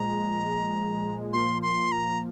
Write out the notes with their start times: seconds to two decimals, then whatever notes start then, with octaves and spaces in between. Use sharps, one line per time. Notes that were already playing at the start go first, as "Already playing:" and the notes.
Already playing: A#2 F3 G#3 A#5
1.33 A#2 F3 A#3 F4 C6
1.62 C6
1.92 A#5